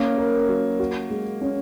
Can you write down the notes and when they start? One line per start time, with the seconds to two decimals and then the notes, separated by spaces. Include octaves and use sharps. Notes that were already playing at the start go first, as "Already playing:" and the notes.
Already playing: A#3 C#4
0.18 A#4
0.49 F#3
0.80 F#4
1.10 G#3
1.41 C#4